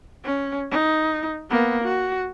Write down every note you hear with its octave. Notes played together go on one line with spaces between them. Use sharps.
C#4
D#4
A#3 B3
F#4